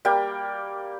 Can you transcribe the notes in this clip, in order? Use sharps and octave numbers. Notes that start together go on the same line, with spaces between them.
G3 A#3 G5